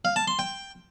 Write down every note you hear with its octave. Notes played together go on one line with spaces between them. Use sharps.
F5
A5
C6
G5